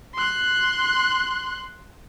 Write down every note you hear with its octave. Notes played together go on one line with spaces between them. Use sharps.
C6 F#6